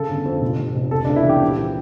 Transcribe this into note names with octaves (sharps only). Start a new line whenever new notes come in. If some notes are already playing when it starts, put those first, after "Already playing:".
Already playing: C#3 A4
G1
F2
F1
F1
F1
C#2 A4
D4
C#2
E4
E3 G4
A#1